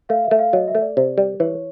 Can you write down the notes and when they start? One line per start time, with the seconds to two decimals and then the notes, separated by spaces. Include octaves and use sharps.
0.09 A3 F5
0.24 E5
0.31 A3
0.39 F5
0.53 F#3 D#5
0.68 E5
0.75 A3
0.81 D5
0.97 C3
1.18 G3
1.40 E3 C#5